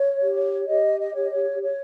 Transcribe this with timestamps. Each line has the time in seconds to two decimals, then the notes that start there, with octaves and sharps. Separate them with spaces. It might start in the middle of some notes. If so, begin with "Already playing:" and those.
Already playing: C#5
0.21 G4
0.68 G4 D#5
0.99 D#5
1.15 C#5
1.21 D#5
1.31 C#5
1.61 C#5